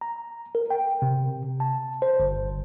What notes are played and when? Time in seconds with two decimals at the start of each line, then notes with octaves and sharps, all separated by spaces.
0.01 A#5
0.55 A#4
0.70 G5
1.02 C3
1.60 A5
2.02 C5
2.20 G1